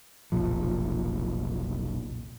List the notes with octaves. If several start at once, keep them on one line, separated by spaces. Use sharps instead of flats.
F1 B1 A#2 F3